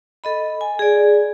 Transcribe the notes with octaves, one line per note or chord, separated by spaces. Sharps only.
A4 D#5 B5
G#5
G#4 D5